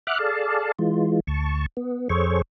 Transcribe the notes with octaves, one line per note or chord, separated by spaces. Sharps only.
E5 F#5 D6 F6 F#6
G#4 A4 D5 F5 A5
E3 G#3 F4
D2 A5 C#6
B3
F2 G#4 A4 C5 C#5 C#6